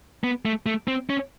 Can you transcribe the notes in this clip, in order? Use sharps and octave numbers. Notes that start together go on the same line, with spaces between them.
B3
A3
A3
C4
C#4